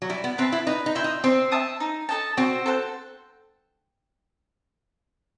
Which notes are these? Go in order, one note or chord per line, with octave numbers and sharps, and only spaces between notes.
F#3
G3 E4
B3
C4 B4 E5 A5
E4
D#4 B4
D#4
E4 E5 G5 C6
D#4
C4 C5
E5 A5 D#6
D#4
A4 D#5 A5
C4 F#4
A4 C5 F#5